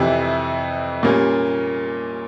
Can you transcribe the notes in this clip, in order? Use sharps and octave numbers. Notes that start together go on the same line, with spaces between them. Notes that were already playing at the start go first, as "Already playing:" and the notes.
Already playing: F2 C3 E3
A#2 G3 A#3 C#4